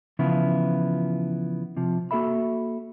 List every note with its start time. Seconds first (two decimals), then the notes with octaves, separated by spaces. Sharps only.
0.19 C#3 E3 F3 B3 E4 F4
1.77 C3 F3
2.11 A#3 F#4 A4 E5 B5